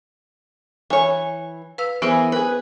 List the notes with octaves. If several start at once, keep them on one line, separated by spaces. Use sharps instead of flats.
E3 C#5 G#5
B4 F5 E6
E3 B3 E4 G#4 A#4 C5
G#4 B4